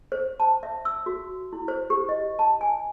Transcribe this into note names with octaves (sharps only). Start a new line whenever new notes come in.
C5
A5
E5
E6
F#4
E4
C5
G4
D#5
A5
G#5